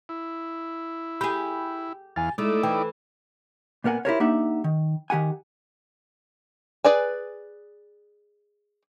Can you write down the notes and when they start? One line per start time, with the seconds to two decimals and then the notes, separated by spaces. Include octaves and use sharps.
0.09 E4
1.21 G4 G#4 B5
2.16 E2 F5 G#5 A6
2.38 G#3 A3 D#4 E4 D5
2.63 E3 G5
3.84 A#2 B3 A#4 F#5 G#5
4.05 E4 F4 G4 A#4 C5 C#5
4.20 A#3 D4 D#4 G4 E5 F#5
4.64 D#3
5.10 D#3 G4 F#5 G#5
6.84 G#4 B4 D5 G#5